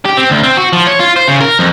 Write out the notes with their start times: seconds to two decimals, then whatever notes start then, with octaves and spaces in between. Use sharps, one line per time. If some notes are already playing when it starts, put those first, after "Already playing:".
0.05 G4
0.17 C4
0.30 D2
0.43 C4
0.57 F#4
0.73 F3
0.87 C#5
1.00 F4
1.16 C5
1.28 C#3
1.41 A#4
1.59 F2